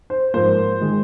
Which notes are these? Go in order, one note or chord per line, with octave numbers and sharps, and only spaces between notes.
C5
G#2 F3 A#3 C5
D#3 G#3